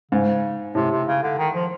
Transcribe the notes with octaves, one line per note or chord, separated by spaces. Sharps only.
G#2 C#3
A2 C3
C3
C#3
D3
D#3
F3